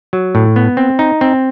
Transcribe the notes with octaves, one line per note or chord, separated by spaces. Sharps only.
F#3
A2
B3
C4
D#4
C4